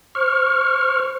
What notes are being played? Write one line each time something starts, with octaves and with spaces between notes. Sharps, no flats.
C5 C#6 F6